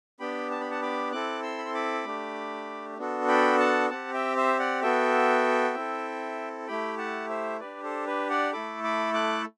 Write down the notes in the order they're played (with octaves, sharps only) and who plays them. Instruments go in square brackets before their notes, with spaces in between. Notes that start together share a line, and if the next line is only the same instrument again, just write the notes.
[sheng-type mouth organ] B3 D4 G4 G5 B5
A5
B5
F#5 A5
B5 D6
C4 E4 A4 D6 F#6
C6 E6
B5
C6
B5 D6
A3 D4 G4
B3 D4 F#4 A4
G5 B5
F#5 A5
C4 G4 F#5 A5
E5 G5
C5 E5
D5 F#5
B3 F#4 A4 E5 G5
C4 E4 A4
A3 E4 G4 G5 B5
F#5 A5
C5 E5
D4 G4 B4 D5
A4 C5
B4
D5 F#5
A3 E4 A4 B5 D6
B5 D6
D6 F#6